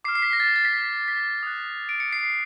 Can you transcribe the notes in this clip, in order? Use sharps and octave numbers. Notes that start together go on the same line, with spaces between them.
D6 F6 C7
C7
B6
A#6
A6
A6
B6
B6
D#6 F#6
D7
C#7
C7